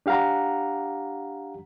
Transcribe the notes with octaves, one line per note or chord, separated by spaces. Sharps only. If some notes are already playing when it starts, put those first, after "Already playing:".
D4 G4 F5 F#5 A#5